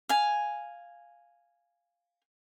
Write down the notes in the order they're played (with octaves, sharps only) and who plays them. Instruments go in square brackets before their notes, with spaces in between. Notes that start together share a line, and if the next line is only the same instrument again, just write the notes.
[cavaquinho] F5 G#5